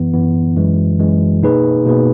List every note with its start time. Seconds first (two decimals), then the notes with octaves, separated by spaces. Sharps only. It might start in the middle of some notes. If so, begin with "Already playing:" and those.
Already playing: F#2 E3 B3
0.13 F#2 E3 B3
0.56 F#2 E3 G#3
0.99 F#2 E3 G#3
1.43 B2 A#3 D#4 G#4 B4
1.86 B2 A#3 D#4 G#4 B4